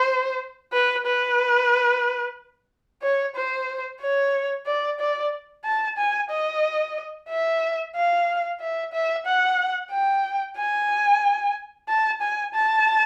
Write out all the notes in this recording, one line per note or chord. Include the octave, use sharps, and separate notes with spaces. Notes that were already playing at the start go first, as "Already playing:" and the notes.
Already playing: C5
B4
B4
C#5
C5
C#5
D5
D5
A5
G#5
D#5
E5
F5
E5
E5
F#5
G5
G#5
A5
G#5
A5